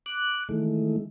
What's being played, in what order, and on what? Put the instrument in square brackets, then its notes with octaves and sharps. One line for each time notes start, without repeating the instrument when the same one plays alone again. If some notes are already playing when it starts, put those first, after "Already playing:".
[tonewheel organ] D6 F#6
D#3 E3 G#3 A3